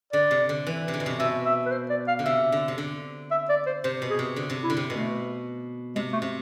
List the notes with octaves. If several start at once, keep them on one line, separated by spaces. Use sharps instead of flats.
D3 D5
C3
D3
E3
C3
D3
B2
C3
B2 E5
E5
B4
C5
D5
F5
D3
C3 E5
D3
C3
D3
E5
D5
C5
C3 C5
B2
G#4
C3
D3
C3
E4
D3
C3
B2 A3
C3 G#3
A3
C3